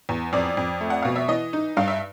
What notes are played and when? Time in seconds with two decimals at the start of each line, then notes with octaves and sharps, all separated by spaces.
0.09 E2
0.33 F2 D5
0.57 F2
0.80 A3
0.90 F#5
1.02 B2 F5
1.16 E5
1.28 E3 D#5
1.53 D#4
1.77 G2 F5
1.88 E5